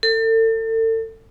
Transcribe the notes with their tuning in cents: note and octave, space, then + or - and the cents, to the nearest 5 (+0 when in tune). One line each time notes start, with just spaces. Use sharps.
A4 +35